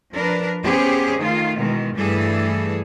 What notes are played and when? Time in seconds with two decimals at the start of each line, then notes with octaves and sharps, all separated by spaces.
0.14 F3 D4 A#4 B4
0.63 B3 C#4 G4 G#4 C5 C#5
1.18 D#3 A3 F4
1.57 B2 D#3 E3 G#3
1.95 G2 E3 G3 A3 G#4 A4